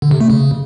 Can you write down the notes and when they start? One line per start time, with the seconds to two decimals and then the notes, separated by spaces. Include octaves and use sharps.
0.02 D3
0.11 C3
0.21 A3
0.30 C#3